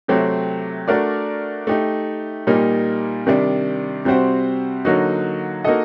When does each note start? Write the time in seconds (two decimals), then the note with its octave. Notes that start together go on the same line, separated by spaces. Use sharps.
0.08 C3 F#3 A3 C4 G4
0.88 A3 D4 F#4 A#4 D5
1.67 A3 D#4 G4
2.47 A#2 G3 A#3 D#4
3.27 C3 D#3 G3 D4
4.05 C3 G3 C4 F#4 C5
4.85 D3 F#3 A#3 D#4 F#4
5.64 A#3 D#4 F#4 A4 D#5